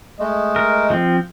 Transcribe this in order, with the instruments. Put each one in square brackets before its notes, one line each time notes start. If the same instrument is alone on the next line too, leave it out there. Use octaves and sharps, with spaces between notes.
[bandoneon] G#3 A3 [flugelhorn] D#5
[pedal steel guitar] A#4
F3 C4